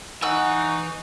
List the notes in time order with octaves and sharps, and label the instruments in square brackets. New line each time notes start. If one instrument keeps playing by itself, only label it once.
[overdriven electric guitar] E3 G#5 [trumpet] D#4 [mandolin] F#5 E6 [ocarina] C#6